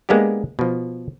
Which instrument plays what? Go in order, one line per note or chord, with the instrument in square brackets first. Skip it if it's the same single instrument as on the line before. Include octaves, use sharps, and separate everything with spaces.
[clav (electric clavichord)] G#3 A#3 B3 D4 G4
B2 F3